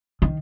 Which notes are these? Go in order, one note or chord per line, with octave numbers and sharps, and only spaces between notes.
D#3